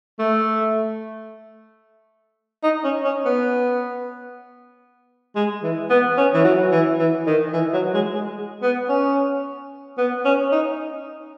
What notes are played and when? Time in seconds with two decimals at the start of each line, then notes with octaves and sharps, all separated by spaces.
0.19 A3
2.64 D#4
2.84 C#4
3.05 C#4
3.25 B3
5.36 G#3
5.63 E3
5.90 B3
6.18 C#4
6.34 E3
6.44 F#3
6.72 E3
6.99 E3
7.27 D#3
7.53 E3
7.74 F#3
7.94 G#3
8.14 G#3
8.63 B3
8.89 C#4
9.98 B3
10.25 C#4
10.52 D#4